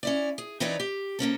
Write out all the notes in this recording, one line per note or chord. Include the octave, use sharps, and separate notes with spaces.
C#4 E4 D5
G#4
E3 C4 D#4 B4 C#5 D5
G4
C3 A#3 C#4 A4